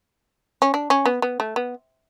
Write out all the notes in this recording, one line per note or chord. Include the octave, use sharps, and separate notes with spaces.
C#4
D4
C#4
B3
B3
A3
B3